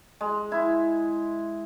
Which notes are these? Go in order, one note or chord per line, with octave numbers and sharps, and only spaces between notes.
G#3
E4